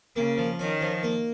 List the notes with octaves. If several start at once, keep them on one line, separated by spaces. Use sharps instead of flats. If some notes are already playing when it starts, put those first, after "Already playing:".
C#3 A#3
F3
D#3 C#4
F3
A#3